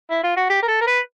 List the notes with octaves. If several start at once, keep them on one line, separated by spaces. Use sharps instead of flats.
E4
F4
F#4
G4
A#4
A4
A#4
B4